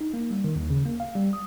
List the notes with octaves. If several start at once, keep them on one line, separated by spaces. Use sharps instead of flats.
D#4
A#3
G3
D#3
D#2
C#3
A#3
F5
G3
D#6